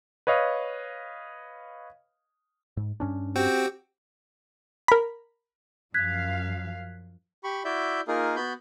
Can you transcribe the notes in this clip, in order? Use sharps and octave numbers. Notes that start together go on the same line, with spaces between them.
B4 C#5 D#5 F5
G#2
G2 C#4 D4
C4 F#4 G4 G5
A#4 B5
F#2 F3 F5 F#6 G#6 B6
G4 B5 C#6
E4 F#4 D5 E5 G6
A#3 D#4 F4 G#4 A#4
B3 F#4 B5 G6